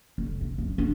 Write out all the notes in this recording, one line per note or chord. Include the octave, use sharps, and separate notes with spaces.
F1
C3
F#2
D4